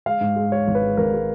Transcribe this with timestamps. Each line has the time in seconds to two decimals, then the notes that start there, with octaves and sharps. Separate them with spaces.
0.06 G#3 F5
0.21 G#2
0.36 G#3
0.52 G#3 C#5
0.67 G#1
0.75 B4
0.82 G#3
0.97 G#1 A#4
1.13 G#3